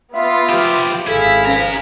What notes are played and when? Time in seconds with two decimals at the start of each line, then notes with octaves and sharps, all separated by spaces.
0.13 B3 F4 E5
0.49 F3 G4
1.07 G#1 E4 G#4 A4 F5 B6
1.46 C#2 F3 C#4 G#4 A#5